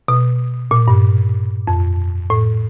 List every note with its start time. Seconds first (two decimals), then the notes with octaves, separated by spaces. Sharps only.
0.08 B2
0.71 A#2
0.88 G2
1.67 F2
2.30 A2